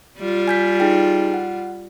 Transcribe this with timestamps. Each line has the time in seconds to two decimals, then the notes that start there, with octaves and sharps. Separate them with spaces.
0.18 G3 F4
0.48 G#5 G6 B6
0.80 D#4 G#4 G5
1.34 F#5